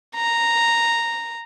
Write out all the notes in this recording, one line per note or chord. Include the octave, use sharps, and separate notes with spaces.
A#5